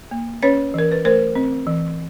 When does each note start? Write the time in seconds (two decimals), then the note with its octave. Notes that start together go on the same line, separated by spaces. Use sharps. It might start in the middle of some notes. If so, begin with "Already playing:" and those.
0.11 A#3
0.43 C#4 B4 C#5
0.74 E3 A#4
0.92 B4
1.04 A3 A#4 C5
1.35 C4
1.67 E3